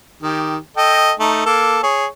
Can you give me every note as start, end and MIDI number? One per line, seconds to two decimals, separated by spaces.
0.22 0.57 51
0.22 0.57 67
0.77 1.12 69
0.77 1.12 75
0.77 1.12 79
1.20 1.45 57
1.20 1.45 63
1.46 1.80 58
1.46 1.80 69
1.83 2.06 68
1.83 2.06 73